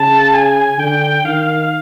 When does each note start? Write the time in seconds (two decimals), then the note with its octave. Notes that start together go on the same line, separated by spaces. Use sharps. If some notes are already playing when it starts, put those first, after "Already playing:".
Already playing: C#3 A5
0.33 G#5
0.78 D3 G5
1.25 D#3 F5